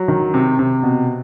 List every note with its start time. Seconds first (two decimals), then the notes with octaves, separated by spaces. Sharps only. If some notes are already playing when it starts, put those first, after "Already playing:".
Already playing: F#3
0.08 D#3
0.34 C3
0.59 C3
0.83 B2